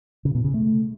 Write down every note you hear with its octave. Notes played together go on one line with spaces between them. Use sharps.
C#3
B2
C#3
A3